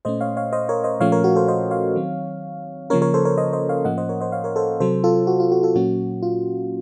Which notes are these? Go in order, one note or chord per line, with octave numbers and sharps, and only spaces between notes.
A#2 A3 C#4 C5 D#5
C#5 F5
C#5 F5
C5 D#5
A#4 C#5
C5 D#5
A#2 F3 A3 C#4 C#5 F5
A#4 C#5
F#4 A#4
A4 C5
C5 D#5
C#5 F5
D#3 F#3 C4
C#3 F3 A#3 C#4 A#4 C#5
A#4 C#5
A4 C5
A#4 C#5
C5 D#5
C5 D#5
C#5 F5
A2 F3 A#3 C#4 D#5 F#5
C5 D#5
A#4 C#5
C5 D#5
C#5 F5
A#4 C#5
A4 C5
C3 F#3 C4 A4 C5
F4 A4
F#4
F4
F#4
F4 A4
A#2 F#3 A#3 C#4 F#4
F4